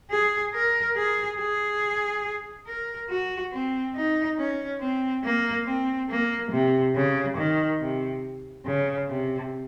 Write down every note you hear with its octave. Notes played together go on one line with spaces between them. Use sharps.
G#4
A#4
G#4
G#4
A#4
F#4
C4
D#4
C#4
C4
A#3
C4
A#3
C3
C#3
D#3
C3
C#3
C3